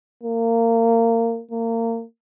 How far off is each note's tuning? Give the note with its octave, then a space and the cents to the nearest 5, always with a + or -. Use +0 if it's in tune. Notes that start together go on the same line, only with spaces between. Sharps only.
A#3 -25
A#3 -30